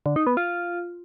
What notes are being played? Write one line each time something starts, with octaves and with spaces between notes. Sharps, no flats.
D3
D#4
B3
F4